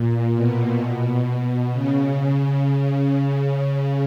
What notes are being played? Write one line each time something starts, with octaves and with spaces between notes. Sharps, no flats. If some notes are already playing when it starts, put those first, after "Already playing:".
Already playing: A#2
B2
C#3